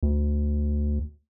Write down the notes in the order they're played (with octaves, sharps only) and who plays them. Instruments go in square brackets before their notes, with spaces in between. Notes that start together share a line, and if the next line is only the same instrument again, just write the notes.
[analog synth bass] D2